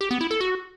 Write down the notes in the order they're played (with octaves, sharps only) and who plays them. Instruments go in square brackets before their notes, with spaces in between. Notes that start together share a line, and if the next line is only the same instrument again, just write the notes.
[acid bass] G4
B3
E4
A4
F#4